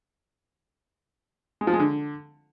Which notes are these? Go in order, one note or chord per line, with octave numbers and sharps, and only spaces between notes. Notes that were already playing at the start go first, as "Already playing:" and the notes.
G#3
F3
G#3
D3